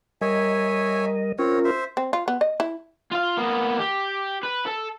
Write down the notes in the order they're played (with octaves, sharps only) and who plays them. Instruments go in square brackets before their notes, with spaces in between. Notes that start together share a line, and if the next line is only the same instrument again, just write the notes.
[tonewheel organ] G3 A#4 D#5 [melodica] C#5 E5 G#5
[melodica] C4 C#5 [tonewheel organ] C#4 F4 A#4
[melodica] C5 E5
[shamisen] C4
F4
B3
D#5
E4
[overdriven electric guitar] F4 F5
A#3 B3
G4
B4
A4